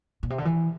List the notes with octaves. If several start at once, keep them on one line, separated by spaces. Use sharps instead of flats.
A#2
C3
D3
E3